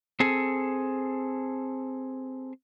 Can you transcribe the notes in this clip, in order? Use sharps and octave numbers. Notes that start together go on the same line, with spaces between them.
C4 G#4 A4